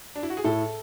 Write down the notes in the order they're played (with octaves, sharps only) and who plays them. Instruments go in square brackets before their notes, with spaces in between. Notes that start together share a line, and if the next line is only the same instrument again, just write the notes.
[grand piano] D4
E4
F#4
G#4
[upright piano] A2 [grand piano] A4